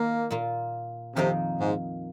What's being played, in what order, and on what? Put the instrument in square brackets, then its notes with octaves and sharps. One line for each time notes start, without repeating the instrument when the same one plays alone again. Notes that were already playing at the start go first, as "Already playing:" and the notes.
Already playing: [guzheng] D#3 [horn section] A#3
[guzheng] A#2 A#3 F4
[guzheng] F2 D#3 A#3 D#4 [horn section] C3
[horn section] G#2